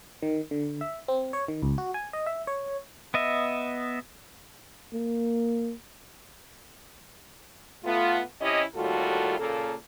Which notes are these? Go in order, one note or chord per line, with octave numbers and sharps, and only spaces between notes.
D#3
D3
E5
C4
C#5
D#3
C#2
F#4
G#5
D#5
E5
C#5
B3 D#5 E5
A#3
A3 B3 F4
C3 C#4 E4 G4 D#5
D#2 A2 G3 F4 F#4 A4
A#2 C#3 A#3 A4